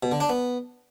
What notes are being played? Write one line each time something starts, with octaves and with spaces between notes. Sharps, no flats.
B2
D3
D4
B3